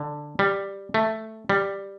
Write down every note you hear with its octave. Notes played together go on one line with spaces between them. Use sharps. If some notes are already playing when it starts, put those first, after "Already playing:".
Already playing: D3
G3
A3
G3